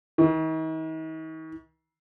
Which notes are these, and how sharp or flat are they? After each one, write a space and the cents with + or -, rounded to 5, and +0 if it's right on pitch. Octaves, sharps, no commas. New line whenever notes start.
D#3 +45